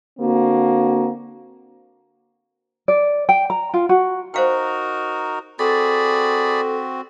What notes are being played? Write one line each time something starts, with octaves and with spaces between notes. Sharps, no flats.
D3 A#3 C4 F#4
D5
G5
A#5
F4
F#4
D#4 F#4 A#4 C5 F5 G5
C4 F#4 G#4 A4 D5 B5